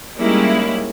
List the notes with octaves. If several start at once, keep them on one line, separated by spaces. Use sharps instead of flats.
G3 G#3 A#3 C#4 D#4 E4